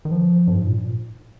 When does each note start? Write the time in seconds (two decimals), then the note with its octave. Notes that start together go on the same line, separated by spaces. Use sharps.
0.05 D#3
0.12 F3
0.48 G2
0.57 G#2
0.66 A#2